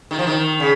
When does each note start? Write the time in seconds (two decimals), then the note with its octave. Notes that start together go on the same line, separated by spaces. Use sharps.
0.11 D#3
0.19 F3
0.27 D#3
0.60 C#3